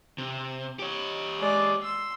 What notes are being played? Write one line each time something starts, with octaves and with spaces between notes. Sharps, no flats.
C3
G4 C#5
G#3 D5
C6 E6